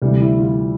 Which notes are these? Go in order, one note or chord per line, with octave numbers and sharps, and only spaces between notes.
D2 C3 E3 G3
E4
F4